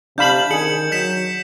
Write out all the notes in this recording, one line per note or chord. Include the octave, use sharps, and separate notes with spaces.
C3 D4 F5 B5 G6 E7 F#7
D#3 G#4 C#7 F#7
F#3 G6 B6 E7